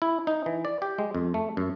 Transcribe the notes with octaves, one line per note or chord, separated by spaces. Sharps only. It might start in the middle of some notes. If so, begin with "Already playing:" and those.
E4
D#4
E3
D5
G4
G#3
F2
A3
F#2